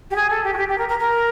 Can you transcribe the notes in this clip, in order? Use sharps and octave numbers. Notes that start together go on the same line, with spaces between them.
G4
G#4
A4
G4
F#4
G4
G4
A#4
A#4
A#4